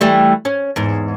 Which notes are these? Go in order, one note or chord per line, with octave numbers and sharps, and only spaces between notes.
E3 G3 A3
C#4
E2 G#2